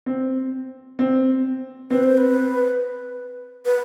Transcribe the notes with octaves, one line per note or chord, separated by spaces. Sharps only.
C4
C4
C4 B4
C5
B4
B4